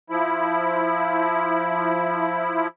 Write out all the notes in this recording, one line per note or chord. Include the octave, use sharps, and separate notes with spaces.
F3 E4